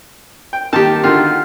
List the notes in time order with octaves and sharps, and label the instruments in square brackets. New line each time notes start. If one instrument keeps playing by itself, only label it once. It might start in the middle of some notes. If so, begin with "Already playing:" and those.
[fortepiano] G5
[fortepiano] D#3 A#3 [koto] G4 A5
[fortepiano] D3 D#3 F#4 [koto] F4